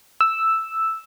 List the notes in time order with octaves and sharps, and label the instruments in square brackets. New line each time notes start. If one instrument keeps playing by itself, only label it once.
[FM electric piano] E6